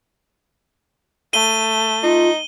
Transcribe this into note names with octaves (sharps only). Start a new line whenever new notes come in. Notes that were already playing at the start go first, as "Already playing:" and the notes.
A3 D#7 G7
D#4 F4